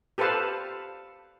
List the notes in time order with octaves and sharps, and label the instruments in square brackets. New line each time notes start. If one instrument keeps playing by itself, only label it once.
[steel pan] G4 A4 B4 C5 F5 A5